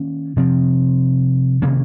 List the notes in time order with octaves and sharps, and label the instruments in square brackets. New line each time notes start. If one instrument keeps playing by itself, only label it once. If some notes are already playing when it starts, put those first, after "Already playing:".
Already playing: [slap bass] D#3 A#3 C#4
C3 F3 C4
C3 D#3 A#3 C#4